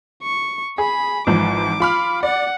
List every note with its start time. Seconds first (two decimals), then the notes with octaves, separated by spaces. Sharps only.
0.22 C#6
0.78 G#4 B5
1.27 G#1 E3 F3 D6
1.80 F4 B5 F6
2.23 D5 F#5